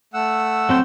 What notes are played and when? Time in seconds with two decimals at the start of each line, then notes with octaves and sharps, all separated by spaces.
0.14 A3 F#5 E6
0.69 F#3 C4 G5